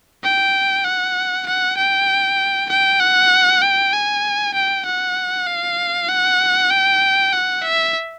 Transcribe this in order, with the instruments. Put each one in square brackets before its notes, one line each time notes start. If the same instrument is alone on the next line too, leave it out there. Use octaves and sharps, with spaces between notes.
[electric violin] G5
F#5
F#5
G5
G5
F#5
G5
G#5
G5
F#5
F5
F#5
G5
F#5
E5